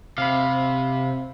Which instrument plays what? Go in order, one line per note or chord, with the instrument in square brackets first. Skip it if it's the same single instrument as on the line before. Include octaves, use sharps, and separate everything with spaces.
[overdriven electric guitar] C3 [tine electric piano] F5 B5